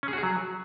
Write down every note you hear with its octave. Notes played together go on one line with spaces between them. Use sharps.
C#4
G#4
F#4
G#4
F#3